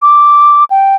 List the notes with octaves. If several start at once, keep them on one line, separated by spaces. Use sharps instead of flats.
D6
G5